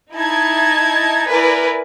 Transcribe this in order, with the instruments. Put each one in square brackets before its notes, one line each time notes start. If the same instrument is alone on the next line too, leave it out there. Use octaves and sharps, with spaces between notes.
[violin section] D#4 E4 A5 G#6
E4 A#4 B4 D5 G#5